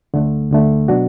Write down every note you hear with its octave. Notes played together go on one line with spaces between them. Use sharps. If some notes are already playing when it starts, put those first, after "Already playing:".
D2 D3 A3
D2 D3 A3
B2 F#3 D4 F#4